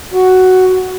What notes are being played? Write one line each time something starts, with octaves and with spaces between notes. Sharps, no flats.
F#4